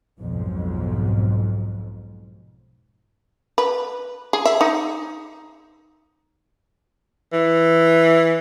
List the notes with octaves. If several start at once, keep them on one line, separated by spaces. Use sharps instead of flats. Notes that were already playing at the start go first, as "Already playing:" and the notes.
B1 F2 G#2
B4
G#4
E5
D#4
E3